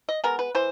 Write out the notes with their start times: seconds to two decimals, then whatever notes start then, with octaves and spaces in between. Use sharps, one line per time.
0.09 D#5
0.24 G#3 B3 A#4
0.39 B4
0.55 E3 C5